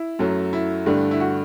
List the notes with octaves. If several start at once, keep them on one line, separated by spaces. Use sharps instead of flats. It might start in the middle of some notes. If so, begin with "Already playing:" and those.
Already playing: E4
F#2 F#3 A3
E4
G2 D3 A3
E4
F#4